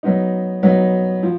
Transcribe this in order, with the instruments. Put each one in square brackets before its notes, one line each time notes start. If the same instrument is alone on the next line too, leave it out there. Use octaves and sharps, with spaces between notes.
[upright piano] F#3 B3 D#4
F#3 B3 D#4
F3